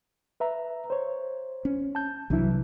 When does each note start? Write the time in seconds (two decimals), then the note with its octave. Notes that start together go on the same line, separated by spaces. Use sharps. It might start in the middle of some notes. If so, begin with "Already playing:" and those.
0.40 B4 E5 A#5
0.90 C5 C#5
1.65 C#4
1.95 A5 G6
2.30 C2 E3 F#3 D4 E4